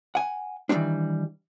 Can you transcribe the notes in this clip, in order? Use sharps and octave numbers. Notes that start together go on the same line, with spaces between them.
F#5 G#5
D#3 E3 F#3 G3 C4 D4